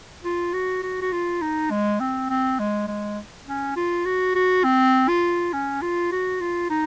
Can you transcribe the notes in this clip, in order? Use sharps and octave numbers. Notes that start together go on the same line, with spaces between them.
F4
F#4
F#4
F#4
F4
D#4
G#3
C4
C4
G#3
G#3
C#4
F4
F#4
F#4
C4
F4
C#4
F4
F#4
F4
D#4